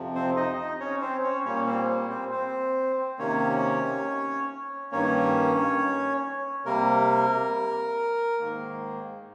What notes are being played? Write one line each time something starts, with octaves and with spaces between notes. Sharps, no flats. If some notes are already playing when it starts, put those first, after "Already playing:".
Already playing: F2 C3 F3
C4 C5
D#4 D#5
D#4 D#5
C#4 C#5
C4 C5
C#4 C#5
A#2 G3 A#3 C#4 C#5
C4 C5
C4 C5
C4 C5
C3 D#3 A#3 C#4 C#5
G2 D#3 A#3 C#4 C#5
C3 G3 A#3 A#4
G#2 D#3 A#3